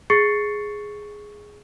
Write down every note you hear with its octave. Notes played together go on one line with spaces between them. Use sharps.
G#4 C#6 A6 C7 C#7